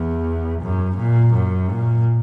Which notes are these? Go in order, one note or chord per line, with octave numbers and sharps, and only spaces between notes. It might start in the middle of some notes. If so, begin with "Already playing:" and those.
Already playing: E2
F#2
A#2
F#2
A#2